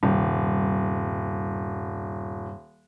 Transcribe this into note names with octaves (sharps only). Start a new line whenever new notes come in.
D#1 G2 C3 G3